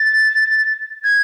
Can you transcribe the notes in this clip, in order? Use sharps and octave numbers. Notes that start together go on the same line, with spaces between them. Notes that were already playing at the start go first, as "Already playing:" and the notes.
Already playing: A6
G#6